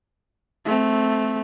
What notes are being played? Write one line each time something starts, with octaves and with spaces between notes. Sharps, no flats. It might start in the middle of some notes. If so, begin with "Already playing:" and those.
A3 C4